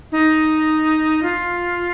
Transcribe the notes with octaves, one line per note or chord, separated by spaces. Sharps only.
D#4
F4